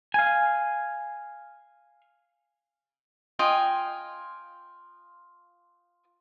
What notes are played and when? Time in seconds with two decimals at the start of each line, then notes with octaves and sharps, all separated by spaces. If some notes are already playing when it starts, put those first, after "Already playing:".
0.14 F5 G#5
3.39 F4 D#5 G5 G#5